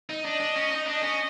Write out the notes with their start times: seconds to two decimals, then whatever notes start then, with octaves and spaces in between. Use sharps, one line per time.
0.10 D#4
0.25 D4 D#5
0.40 D4
0.56 C#4
0.71 D#4
0.87 D4 D#5
1.02 C#4